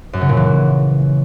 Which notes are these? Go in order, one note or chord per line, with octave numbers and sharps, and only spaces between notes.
F#2
C#3
A#2
E3